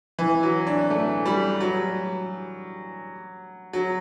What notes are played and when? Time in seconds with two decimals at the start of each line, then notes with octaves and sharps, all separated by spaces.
0.19 E3
0.43 F#3
0.67 D4
0.90 A3
1.25 G3
1.61 F#3
3.73 F#3